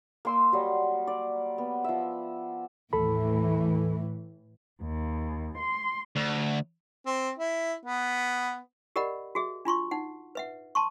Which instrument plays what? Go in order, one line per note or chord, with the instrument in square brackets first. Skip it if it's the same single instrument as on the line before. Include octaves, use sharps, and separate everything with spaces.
[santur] A#3 C6 E6
F#3 G3 D#5
D5
B3
F3 E5
[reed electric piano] D#2 A4 B5 [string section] A2 E3
[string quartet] D#2
C6
[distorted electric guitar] D2
[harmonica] C4
E4
B3
[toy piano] G4 A#4 D5 D#5 F#5 B5
F#4 G#4 E5
D4 F4 C6 C#6
D#4 F#5
B4 E5 F#5
A5 C6 C#6